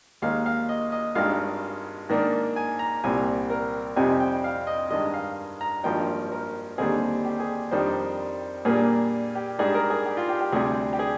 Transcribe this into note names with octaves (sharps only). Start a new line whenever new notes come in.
D#2 D#3 G#3 D#4 F5
F5
D#5
D#5
G#1 G2 D#3 G#3 F5
G#2 D#3 A#3 D4
G#5
A#5
C2 A#2 G3 C4 G#5
A#4
F2 C3 G3 C4 D#4 G#5
G5
F5
D#5
G2 D#3 G#3 D#5
F5
A#5
G#1 G2 F3 A#3 D#4 G5
A#4
D#2 D3 G3 C4 D#4 G#4
G4
G#4
F2 D#3 G3 D4 C5
A#2 G3 A#3 D4 G#4
G4
G#2 G3 D4 G#4
A#4
G#4
G4
F4
G4
G4
D2 C3 G3 G#4
G4
G#4